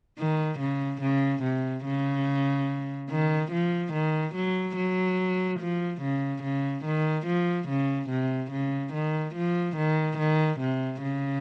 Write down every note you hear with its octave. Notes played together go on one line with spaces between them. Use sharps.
D#3
C#3
C#3
C3
C#3
D#3
F3
D#3
F#3
F#3
F3
C#3
C#3
D#3
F3
C#3
C3
C#3
D#3
F3
D#3
D#3
C3
C#3